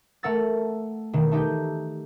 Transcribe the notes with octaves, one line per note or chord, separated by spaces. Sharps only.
A3 A#4 F#5 E6 A6
E1 D#3
A3 D#4 G4 G6